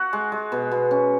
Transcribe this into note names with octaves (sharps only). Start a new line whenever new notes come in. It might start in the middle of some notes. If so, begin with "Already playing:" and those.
Already playing: F#4 F#5
G#3
G#3
B2
B2
C#4